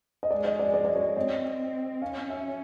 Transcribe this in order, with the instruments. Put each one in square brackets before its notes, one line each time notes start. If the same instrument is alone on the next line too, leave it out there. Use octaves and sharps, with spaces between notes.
[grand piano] D#5
[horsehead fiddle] G#3 [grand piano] D5
[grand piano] D#5
D5
D5
D5
C#5
[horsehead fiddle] C4 [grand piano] D#5
[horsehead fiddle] C#4 [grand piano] F5
[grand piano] E5